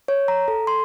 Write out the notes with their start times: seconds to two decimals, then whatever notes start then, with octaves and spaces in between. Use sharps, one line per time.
0.08 C#5
0.28 A#5
0.48 A4
0.67 C6